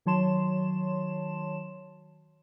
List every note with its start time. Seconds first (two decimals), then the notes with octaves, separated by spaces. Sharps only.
0.06 D#3 F#3 C#5 A5 C6 E7